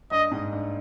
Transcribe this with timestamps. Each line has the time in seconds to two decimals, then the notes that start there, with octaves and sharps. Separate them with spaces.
0.11 G2 D#5
0.31 G#2
0.53 G2